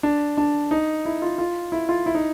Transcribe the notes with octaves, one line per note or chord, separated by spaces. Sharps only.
D4
D4
D#4
E4
F4
F4
E4
F4
E4
D#4